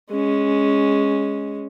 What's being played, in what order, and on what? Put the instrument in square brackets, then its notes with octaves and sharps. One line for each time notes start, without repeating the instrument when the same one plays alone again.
[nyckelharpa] G#3 C#4